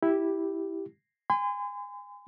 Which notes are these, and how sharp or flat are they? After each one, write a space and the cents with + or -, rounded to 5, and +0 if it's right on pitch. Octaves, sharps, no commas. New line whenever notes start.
E4 -5 G4 +0
G#5 -30 C6 -45